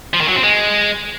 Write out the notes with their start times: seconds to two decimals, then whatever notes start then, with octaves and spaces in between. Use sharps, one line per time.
0.14 F3
0.21 D#3
0.28 F#3
0.36 C4
0.43 G#3